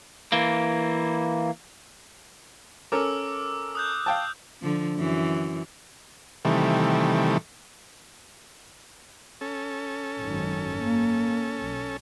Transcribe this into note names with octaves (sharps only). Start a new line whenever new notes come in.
E3 A#3
C#4 A4 A#4 D6 E6
D#6 F#6 G6
F5 G5 A5
D3 F3
F#2 E3
C3 D#3 E3 G3 A3
C#4 A4
G#1 F#2 D#3
A#3
B1